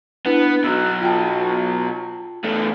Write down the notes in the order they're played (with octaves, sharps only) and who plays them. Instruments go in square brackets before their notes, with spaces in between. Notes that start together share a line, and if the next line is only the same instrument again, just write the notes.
[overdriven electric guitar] B3 [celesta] D4 E4 B4
[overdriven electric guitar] B2 F#3 [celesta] E6 F#6
[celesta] F4 G5 A5
[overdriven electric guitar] E2 A3